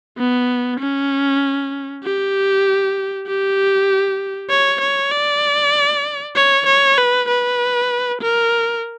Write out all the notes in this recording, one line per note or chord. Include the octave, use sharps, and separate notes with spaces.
B3
C#4
G4
G4
C#5
C#5
D5
C#5
C#5
B4
B4
A#4